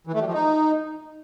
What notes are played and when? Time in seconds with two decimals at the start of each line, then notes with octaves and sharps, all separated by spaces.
0.07 E3
0.14 A3
0.20 G3
0.27 F3
0.33 D#4